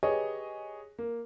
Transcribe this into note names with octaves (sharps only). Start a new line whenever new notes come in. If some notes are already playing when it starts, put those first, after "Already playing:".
G4 G#4 B4 C#5 D#5
A#3